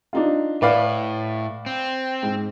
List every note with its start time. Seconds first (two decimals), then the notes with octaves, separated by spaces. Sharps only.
0.13 D4 D#4 F4
0.62 A2 B4 D5 F5
1.66 C4
2.23 G#2